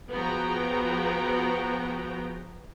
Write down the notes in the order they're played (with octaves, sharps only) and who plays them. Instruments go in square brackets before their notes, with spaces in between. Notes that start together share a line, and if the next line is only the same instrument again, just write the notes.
[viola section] F3 B3 F#4 G#4 G5 A#5